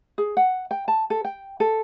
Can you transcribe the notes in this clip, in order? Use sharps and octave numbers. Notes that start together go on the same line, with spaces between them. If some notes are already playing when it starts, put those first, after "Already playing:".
G#4
F#5
G5
A5
A4
G5
A4